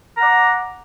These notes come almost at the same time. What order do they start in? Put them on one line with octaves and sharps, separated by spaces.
A#5 F#5 D5